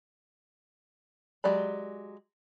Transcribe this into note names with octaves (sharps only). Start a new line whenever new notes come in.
F#3 G#3 G4 D5 B5